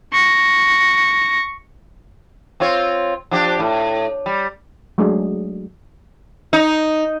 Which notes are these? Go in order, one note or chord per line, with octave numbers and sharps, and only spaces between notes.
C#6 A#6
C4 F4 C#5
F3 D4 G4
A2
G3
F#3 G#3 A3 D4 G#4
D#4